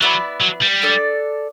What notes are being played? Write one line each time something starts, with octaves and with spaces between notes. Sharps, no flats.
F#3 B3 E4 B4 D5
F#3
G3
D4 A4 D5